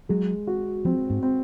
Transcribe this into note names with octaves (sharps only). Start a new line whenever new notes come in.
F#3 G#3
F#4
F3 C4
G#2
C4